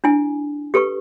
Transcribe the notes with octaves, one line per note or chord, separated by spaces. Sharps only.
D4 E4 G#5
G4 A4 B4 C#6